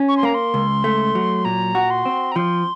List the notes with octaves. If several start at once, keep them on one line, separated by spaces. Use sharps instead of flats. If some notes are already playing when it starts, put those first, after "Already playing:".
Already playing: C#4
C#6
C6
A#3 A#5
C6
C#2
A3
F#3
A#2 A#5
F#4
C6
C4
A#5
F3 C6